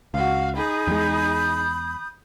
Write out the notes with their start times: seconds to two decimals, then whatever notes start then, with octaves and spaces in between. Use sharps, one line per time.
0.14 C#2 F#4 F5
0.56 D#4 G#4 B5 D#6 G6
0.87 E2 G#3